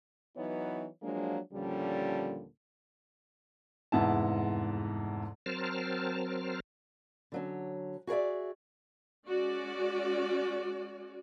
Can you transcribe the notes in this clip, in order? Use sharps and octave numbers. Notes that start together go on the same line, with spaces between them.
E3 F#3 B3 D#4 C#5
F3 F#3 G#3 A#3 D4
D#2 A#2 D3 F3 G3 C#4
F1 E2 G#2 B3 E4 A5
F#3 C4 A#4 C5 A5 F6
D3 F#3 C#4
F#4 G#4 A#4 D5 E5
G#3 C#4 F#4 D5